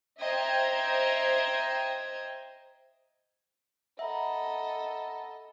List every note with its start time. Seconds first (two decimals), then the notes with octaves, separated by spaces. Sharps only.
0.23 C5 D#5 E5 G5 A#5 G#6
3.99 A4 D#5 E5 F#5 A#5 B5